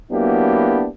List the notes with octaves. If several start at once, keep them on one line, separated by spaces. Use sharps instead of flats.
F#3 A#3 B3 D4 E4 G4